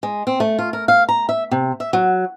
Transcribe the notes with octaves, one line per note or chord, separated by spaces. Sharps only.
G#3
C4
A3
F4
A#4
F5
A#5
E5
C3
E5
F#3